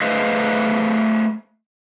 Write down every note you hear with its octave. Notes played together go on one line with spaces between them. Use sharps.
A3 G#4 B4 C5 D#5 F5